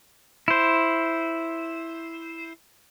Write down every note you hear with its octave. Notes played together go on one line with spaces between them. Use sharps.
E4 C5